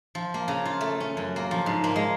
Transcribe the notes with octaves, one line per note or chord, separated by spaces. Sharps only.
F3
A#3
C#3
F4
A3
C#4
F#2
A#3
F3
G#2
A#3
G#3